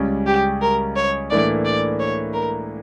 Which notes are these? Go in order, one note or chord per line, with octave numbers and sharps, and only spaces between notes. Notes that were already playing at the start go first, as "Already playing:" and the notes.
Already playing: C#2 C#3 G3 C#4
G4
A#4
C#5
A2 E3 A#3 D4 D5
D5
C#5
A#4